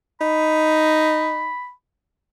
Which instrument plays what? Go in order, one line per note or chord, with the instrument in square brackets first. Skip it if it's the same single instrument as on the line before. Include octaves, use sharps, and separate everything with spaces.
[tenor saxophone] D#4 [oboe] B5